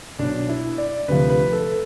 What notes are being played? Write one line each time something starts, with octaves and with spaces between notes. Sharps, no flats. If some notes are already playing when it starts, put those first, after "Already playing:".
B1 B2 D4
E4
D5
D2 C3 F3 B4
B4
A4